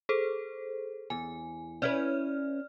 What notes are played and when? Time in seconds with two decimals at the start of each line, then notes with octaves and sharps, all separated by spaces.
0.09 G#4 A4 C5
1.10 E2 G#5
1.82 C#4 E4 B4 D5 F6